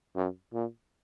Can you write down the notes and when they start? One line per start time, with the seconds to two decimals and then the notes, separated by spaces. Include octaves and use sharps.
0.16 F#2
0.53 A#2